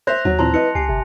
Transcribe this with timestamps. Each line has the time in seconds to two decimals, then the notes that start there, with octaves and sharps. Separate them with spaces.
0.07 C5 E5 F#6 A#6 F7
0.25 D#2 F#3
0.39 A#2 E3 C4 A5 A#5 C6
0.54 E4 B4 D#5 C#7
0.75 C#2 G4 G#5 C7
0.89 G1 C3